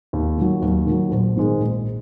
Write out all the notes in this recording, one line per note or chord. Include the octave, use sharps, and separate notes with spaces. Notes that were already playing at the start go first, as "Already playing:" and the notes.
D#2
D#3 F#3
D#2
D#3 F#3
A#1
G#2 D#3 G#3
A#1